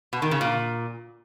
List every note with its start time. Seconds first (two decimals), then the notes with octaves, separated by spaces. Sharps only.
0.13 B2
0.22 D#3
0.31 C#3
0.41 A#2